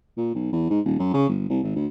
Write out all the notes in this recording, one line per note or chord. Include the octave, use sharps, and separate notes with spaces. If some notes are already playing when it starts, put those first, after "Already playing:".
A#2
B1
E2
G#2
D#1
F#2
C#3
G1
C2
G#1
D2